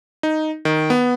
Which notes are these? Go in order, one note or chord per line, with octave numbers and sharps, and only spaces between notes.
D#4
D#3
B3